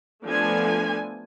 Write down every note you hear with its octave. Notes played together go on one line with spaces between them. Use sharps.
F3 A3 B3 D4 A4 G#5